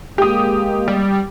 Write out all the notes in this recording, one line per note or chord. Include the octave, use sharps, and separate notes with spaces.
G#3 A#3 G4 D#6
G3